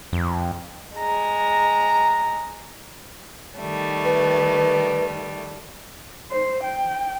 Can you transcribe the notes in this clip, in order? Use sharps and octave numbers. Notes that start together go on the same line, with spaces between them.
F2
G#3 A#5
D#3 G3 A3
B4
C5
G5